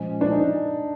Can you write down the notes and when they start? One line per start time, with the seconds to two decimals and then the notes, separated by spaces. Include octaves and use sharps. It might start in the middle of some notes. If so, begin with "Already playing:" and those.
Already playing: A#2 F3 G#3 C#4
0.21 D4
0.32 D#4